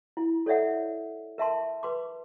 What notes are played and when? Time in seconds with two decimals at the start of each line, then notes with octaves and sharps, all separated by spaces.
0.17 E4
0.46 A4 C#5 D5 E5 F#5
1.38 A#4 E5 A5 C6
1.83 B4 C6 D6